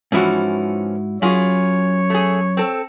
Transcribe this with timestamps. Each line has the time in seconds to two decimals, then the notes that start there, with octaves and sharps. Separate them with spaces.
0.12 G#2 E3 F3 C#4 E4 F#4
1.22 F#2 E4 F4 G#4 C#5
2.10 A3 G#4
2.57 C4 A4